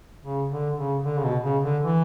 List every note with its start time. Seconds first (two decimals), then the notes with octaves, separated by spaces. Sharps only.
0.24 C#3
0.50 D3
0.77 C#3
1.03 D3
1.18 C#3
1.24 B2
1.44 C#3
1.64 D3
1.83 E3